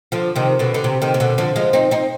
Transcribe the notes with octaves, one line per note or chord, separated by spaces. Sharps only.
D3 F3
C3 D#3
B2 D3
D3
C3
C3 D#3
C3
B2 D3
D3 F3
F3 G#3
C4 D#4
C4 D#4